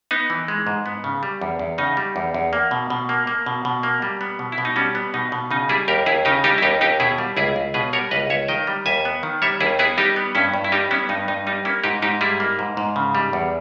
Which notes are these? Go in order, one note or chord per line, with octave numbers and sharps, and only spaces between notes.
B3 D#4
E3
G#3
G#2
B3
C#3
G3
E2
E2
C#3 D#4
G3
E2
E2
A#3
B2
B2
A#3
A#3
B2
B2
A#3
G3
B3
B2
E4
B2
D#4
G3 C#4
B3
B2 D#4
B2
C#3 D#4
G3 E4 G#4
D#2 G4 A#4
D#2 E4 G#4
C#3 D#4 G4
G3 D#4 G4
E4
D#2 D#4 G4
D#2 D#4 G4
B2 E4 G#4
G3
C#2 E4 G#4
C#2
B2 G#4 B4
G3 A#4 C#5
C#2 B4 D#5
C#2 C#5 E5
D#3 D#5 G5
G3
D#2 E5 G#5
B3
D#3
G3 C#5 E5
D#2 E4 G#4
B3 E4 G#4
G3 D#4 G4
B3
G2 C#4 E4
G2
E4
G3 D#4 G4
B3 C#4 E4
G2 D#4
G2 D#4
G3 D#4
A#3 C#4 E4
G#2 D#4 G4
G#2 D#4 G4
G3 E4 G#4
A#3
G#2
G#2
C#3
G3
E2